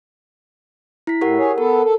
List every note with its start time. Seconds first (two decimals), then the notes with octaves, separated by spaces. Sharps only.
1.07 E4 B6
1.21 A2 G4 A#4 F#5
1.38 G#4 C#5
1.58 B3 A4 A#4
1.85 A4